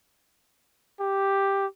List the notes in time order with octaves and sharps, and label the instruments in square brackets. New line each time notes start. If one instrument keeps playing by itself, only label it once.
[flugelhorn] G4